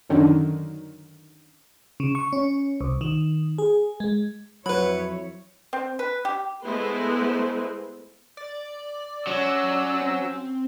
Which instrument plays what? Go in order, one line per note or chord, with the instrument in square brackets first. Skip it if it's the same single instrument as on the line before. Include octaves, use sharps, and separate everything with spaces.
[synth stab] F#2 D3 D#3
[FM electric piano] C#3
C#6
C#4
C2
D#3
G#4
G#3
[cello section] F2 E4 C#5 [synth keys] F#3 [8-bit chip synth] B4 B5
[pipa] C4
B4
G4
[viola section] G#3 A3 B3 E4 B4 C5
[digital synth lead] D5
[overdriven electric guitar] F#3 [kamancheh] C#4 E6
[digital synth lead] C4